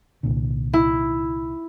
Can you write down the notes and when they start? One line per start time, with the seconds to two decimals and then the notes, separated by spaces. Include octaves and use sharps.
0.23 C2 A#2 D3
0.73 E4